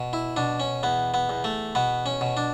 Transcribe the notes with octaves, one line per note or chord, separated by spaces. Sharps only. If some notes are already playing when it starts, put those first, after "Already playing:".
Already playing: B2
E4
B2 D4
C#4
E2 B3
B3
E2
A3
B2 B3
C#4
B2
D4